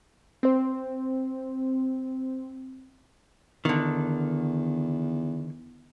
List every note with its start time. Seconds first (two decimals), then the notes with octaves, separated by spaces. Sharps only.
0.43 C4 C5
3.65 E2 D3 D#3